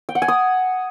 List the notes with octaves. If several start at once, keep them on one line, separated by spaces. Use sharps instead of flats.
G5
F#5
G#5
D#6